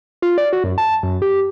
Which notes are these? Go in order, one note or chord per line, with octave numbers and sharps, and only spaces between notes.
F4
D5
F#4
F#2
A5
F#2
G4